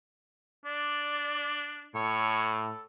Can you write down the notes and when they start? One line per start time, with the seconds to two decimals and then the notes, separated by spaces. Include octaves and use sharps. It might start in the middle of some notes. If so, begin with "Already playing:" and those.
0.65 D4 D5
1.95 A2 A4 C#5